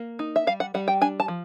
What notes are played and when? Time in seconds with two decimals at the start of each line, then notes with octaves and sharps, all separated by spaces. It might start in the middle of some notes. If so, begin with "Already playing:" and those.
Already playing: A#3
0.19 D#4
0.36 E5
0.47 G3 F5
0.60 F#5
0.74 G3 F#5
0.88 G5
1.01 D4 G#5
1.20 A5
1.28 F3